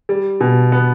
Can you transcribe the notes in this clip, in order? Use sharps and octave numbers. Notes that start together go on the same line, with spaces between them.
G3
B2
B3